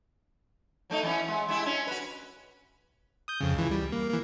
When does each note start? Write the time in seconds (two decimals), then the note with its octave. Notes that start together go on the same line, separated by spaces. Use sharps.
0.90 F#3 A3 D#4
1.03 E3 F#3 C#4
1.28 G#3
1.48 G#3 E4 G4
1.66 C#4 D4
1.87 F#4 B4
3.28 D#6 G6
3.40 F2 C#3
3.54 C#2 E3
3.71 G3
3.92 A#3
4.10 E3 A#3